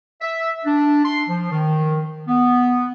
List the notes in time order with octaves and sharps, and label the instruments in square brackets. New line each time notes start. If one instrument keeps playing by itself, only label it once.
[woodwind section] E5
D4
C6
F3
D#3
B3